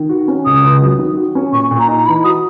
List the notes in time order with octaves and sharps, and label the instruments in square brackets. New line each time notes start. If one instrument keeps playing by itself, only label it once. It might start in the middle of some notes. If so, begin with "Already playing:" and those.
Already playing: [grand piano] D#3
F#4
C#4
[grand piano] C#2 [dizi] D#6
[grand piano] C#2
F#3
D#3
F#4
C#4
[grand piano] A#2 [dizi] C#6
[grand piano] A#2
[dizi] A#5
[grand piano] D#4
[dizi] A#5
[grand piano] E3 [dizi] B5
[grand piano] F#4 [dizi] D#6